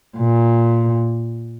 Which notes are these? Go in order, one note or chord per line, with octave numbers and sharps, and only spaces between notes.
A#2